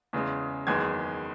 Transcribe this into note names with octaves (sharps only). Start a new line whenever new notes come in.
E2 C#3 G#3
F#1 E2 D#3 G#3 G#6